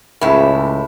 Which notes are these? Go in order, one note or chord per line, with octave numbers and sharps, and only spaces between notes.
C#2 A2 E4